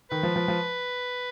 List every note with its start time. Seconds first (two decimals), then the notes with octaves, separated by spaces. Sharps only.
0.11 D#3 B4
0.23 F3
0.36 F3
0.48 F3